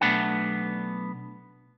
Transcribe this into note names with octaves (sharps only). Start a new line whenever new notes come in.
B1 A3 B3 D4 F#5